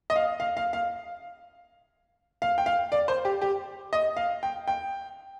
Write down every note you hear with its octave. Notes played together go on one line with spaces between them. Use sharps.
D#5
F5
F5
F5
F5
F5
G5
F5
D5
C5
G4
G4
D#5
F5
G5
G5